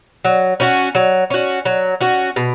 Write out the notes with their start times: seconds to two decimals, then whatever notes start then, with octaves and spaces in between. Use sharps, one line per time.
0.25 F#3
0.60 C#4 F#4
0.95 F#3
1.30 C#4 F#4
1.65 F#3
2.01 C#4 F#4
2.36 B2